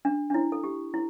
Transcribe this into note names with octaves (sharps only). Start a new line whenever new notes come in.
D4
D4
E4
A4
G4
E4